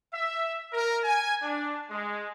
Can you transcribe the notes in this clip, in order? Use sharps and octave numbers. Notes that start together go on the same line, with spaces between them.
E5
A#4
G#5
D4
G#3